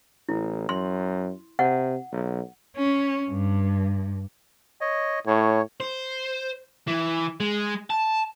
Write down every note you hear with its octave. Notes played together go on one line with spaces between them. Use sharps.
A1 E4
F#2 C6
C3 F#5
B1
C#4
G2
C#5 D#5
A2 C#5
C5
E3
G#3
A5